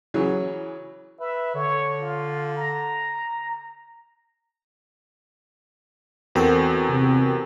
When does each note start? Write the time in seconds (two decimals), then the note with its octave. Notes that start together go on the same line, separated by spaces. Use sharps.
0.14 C#3 E3 F#3
1.20 B4 E5
1.55 D3 C#5
2.02 F4
2.57 A#5
6.35 E2 C4 F#4 A4 A#4 G5
6.89 C3